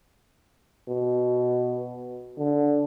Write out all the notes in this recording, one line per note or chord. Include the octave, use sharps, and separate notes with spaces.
B2
D3